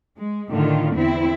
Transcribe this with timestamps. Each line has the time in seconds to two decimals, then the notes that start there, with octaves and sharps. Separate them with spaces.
0.19 G#3
0.52 A2 D3 D#3 F4
0.95 E2 C4 E4